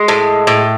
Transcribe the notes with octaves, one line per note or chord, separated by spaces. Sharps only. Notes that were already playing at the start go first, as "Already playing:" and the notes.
Already playing: G#3
A2
A2